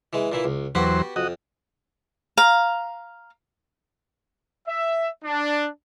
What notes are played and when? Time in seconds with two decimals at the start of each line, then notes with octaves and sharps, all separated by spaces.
0.13 E3 G#3
0.32 A#2 E3 E4
0.44 C#2
0.75 E2 F#3 B3 F#4 G4 C5
1.16 F2 F#4 D#5
2.37 F5 A#5
4.67 E5
5.24 D4